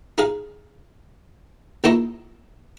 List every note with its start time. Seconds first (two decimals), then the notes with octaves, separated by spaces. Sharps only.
0.18 D#4 G#4 F5
1.84 C#2 A#3 D#4 E4 D#5 C#6